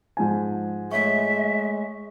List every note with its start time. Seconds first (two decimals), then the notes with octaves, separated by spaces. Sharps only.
0.17 G#2 F3 G#5
0.91 G#3 A3 C#5 E5 C#6